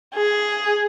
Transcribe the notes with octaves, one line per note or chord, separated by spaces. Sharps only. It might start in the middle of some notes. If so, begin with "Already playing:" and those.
G#4